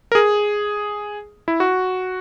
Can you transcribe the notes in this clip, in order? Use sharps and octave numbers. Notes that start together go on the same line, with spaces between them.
A#4
G#4
E4
F#4